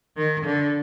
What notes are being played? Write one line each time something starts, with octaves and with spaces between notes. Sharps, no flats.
D#3
D3